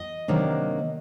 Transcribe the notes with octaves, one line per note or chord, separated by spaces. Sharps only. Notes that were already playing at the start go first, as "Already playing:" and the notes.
Already playing: D#5
C3 D#3 F#3 A#3 D4